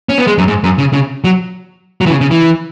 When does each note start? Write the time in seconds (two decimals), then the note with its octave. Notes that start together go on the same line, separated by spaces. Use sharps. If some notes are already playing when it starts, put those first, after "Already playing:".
0.09 C#4
0.18 B3
0.27 G#3
0.38 F#2
0.48 G#2
0.64 F#2
0.78 C#3
0.93 C#3
1.24 F#3
2.01 F#3
2.06 E3
2.10 C#3
2.21 C#3
2.31 E3